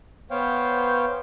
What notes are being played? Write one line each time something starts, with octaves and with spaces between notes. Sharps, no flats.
B3 C5 C#5 F5 G5